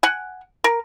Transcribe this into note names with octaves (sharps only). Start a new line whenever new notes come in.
F#5 G#5
A#4